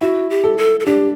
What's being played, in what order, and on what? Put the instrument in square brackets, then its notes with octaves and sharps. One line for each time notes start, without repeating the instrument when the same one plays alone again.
[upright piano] E4 [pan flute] F#4
[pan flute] G4
[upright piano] A4
[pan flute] A4
A4
[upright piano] D4 [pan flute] G4